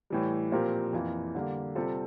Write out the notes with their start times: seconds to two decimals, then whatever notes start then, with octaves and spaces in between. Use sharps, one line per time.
0.10 A2 E3 G3
0.52 A#2 F3 C4 G4 A#4
0.93 F2 E3 A#3 F4
1.35 D3 G3 A#3
1.75 C3 G3 C4 F4 A4